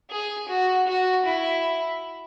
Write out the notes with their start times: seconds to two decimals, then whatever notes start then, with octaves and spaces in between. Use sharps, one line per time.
0.11 G#4
0.49 F#4
0.87 F#4
1.26 E4